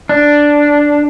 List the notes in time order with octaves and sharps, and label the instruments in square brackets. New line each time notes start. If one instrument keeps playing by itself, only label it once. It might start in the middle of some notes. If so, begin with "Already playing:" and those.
[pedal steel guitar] D4